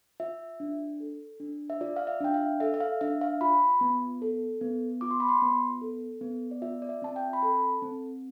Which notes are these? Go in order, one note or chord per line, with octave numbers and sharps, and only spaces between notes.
F4 E5
D4
A4
D4
E5
F4 D5
F5
E5
D4 G5
F5
A4 E5
E5
F5
D4 E5
F5
F4 B5
B3
A4
B3
F4 D6
C6
B5
C6
B3
A4
B3
D5
F4 E5
D5
E5
C4 A5
G5
B5
A4 A5
C4